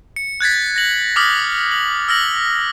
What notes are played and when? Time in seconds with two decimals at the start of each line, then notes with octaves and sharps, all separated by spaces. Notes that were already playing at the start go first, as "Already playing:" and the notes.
0.16 C#7
0.41 F#6 G#6 A6 B6
0.76 A#6 F#7
1.16 D6 D#6 F6 B6 F#7
1.71 F#7
2.08 E6 F6 A#6 F#7